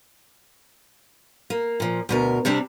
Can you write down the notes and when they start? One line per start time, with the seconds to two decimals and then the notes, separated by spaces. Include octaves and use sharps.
1.50 A#3
1.80 A#2 F3
2.09 D2 B2 A#4
2.45 C3 G3 C4 D4